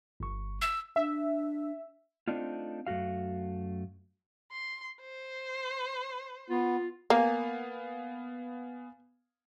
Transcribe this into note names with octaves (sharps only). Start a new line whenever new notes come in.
G1 C#6
E6
D4 E5
A3 C4 D4 D#4 F4
F#2 A3 F#4 F5
C6
C5
B3 F4
A#3 B3 F5 G#5